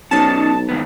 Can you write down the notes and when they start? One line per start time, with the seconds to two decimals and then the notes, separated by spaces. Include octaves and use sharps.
0.11 B1 C#4 D#4 C#5 A5
0.69 G#2 D#3 B3